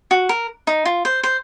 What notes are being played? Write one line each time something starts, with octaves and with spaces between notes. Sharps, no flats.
F#4
A#4
D#4
F4
C5
C5